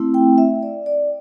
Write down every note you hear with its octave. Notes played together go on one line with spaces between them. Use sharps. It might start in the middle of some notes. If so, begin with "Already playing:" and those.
Already playing: A3 C4 E4
G5
E5
D5
D5